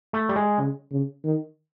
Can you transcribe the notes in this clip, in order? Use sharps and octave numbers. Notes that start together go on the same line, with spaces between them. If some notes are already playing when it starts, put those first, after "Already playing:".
A3
G3
G#3
C#3
C#3
D#3